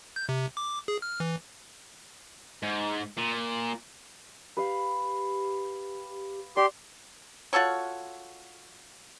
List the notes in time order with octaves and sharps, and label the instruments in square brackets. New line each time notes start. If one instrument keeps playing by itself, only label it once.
[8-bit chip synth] G6
C3
D6
G#4
F6
E3
[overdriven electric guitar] G#2
A#2
[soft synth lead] G4 [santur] B4 F5
[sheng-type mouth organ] G4 C6 [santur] D5
[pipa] F4 F#4 A4 C#5